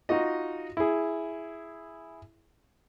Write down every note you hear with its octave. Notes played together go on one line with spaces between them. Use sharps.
D#4 F4 F#4 D#5
E4 G#4